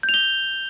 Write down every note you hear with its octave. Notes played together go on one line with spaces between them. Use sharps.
G6
F7
G7